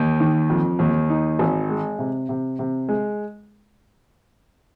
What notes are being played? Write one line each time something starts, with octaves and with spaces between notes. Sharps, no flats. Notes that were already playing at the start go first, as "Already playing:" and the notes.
Already playing: D#2 D#4
D#3
F2
D#2
D#4
G#1
G#3
C3
C3
C3
G#3